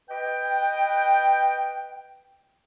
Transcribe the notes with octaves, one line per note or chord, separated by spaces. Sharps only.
B4 D#5 G5